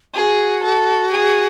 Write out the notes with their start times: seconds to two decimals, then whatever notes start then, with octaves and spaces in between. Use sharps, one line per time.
0.14 F#4 G#4
0.63 A4
1.12 G#4